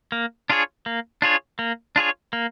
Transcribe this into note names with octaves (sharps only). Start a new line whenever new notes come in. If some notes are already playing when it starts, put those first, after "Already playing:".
A#3
D4 F4 G#4 C#5
A#3
D4 F4 G#4 C#5
A#3
D4 F4 G#4 C#5
A#3